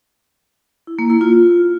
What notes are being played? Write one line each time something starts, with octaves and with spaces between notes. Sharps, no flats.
E4
A#3
E4
F4